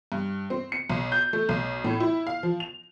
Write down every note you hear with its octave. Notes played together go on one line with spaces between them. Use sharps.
G2
C4
C#7
B1
G6
A3
B1
A2
E4
F5
F3
F7